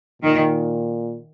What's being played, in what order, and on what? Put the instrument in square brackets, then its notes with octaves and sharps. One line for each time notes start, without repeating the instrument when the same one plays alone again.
[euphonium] A#2 [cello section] D#3